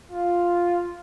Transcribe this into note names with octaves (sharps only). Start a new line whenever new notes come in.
F4